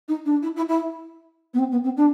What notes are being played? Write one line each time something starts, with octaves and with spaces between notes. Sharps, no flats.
D#4
D4
E4
E4
E4
B3
C4
B3
C4
D4